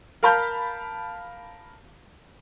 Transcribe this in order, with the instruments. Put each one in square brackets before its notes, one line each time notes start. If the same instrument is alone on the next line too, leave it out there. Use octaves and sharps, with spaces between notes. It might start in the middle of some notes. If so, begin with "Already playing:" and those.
[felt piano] A#4 F5 A5 B5 F6 G6